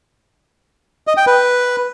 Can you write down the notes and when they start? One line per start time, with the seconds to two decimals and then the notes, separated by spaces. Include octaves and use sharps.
1.07 D#5
1.17 G5
1.27 B4